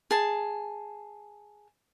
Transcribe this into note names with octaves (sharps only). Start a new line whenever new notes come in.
G#4 A5